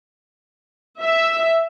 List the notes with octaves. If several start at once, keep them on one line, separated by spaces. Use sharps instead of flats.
E5